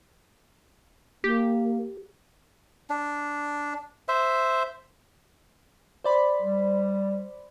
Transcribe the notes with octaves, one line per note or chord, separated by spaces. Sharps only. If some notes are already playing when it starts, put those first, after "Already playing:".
A#3 G4
D4
C5 E5
C5 D5 B5
G3